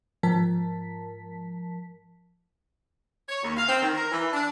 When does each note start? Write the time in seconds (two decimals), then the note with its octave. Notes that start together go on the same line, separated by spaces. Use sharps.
0.23 G#2 F3 A#4 A5 B6
3.29 C#5
3.43 D#2
3.57 F5
3.69 C4
3.83 D#3
3.95 A#4
4.12 E3
4.33 D4